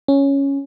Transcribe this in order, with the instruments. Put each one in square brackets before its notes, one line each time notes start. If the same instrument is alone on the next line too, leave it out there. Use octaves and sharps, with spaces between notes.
[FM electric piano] C#4